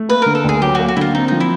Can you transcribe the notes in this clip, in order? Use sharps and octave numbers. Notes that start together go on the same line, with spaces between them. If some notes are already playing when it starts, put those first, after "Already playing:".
Already playing: A3
A#3 B4
D3 A#4
A4
D2 G#4
F#3 G4
A#3 F#4
F#4
D3 E4 F4
C4 D#4
F3 D#4
E4